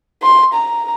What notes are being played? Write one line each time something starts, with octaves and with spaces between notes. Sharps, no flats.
C6
A#5